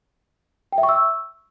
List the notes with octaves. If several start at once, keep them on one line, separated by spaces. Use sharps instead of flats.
G5
E5
C#6
E6